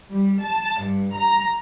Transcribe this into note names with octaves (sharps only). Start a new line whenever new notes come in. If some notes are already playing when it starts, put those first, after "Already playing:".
G3
A5
G2
A#5